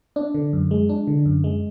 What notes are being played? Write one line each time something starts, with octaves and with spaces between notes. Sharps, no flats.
D4
D3
F#2
G#3
D4
D3
F#2
G#3